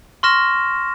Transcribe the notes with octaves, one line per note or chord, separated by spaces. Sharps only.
C6 C#6 F6 A#6 E7